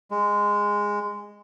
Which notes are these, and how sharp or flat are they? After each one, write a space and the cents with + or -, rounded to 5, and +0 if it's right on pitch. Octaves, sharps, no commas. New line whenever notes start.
G#3 -10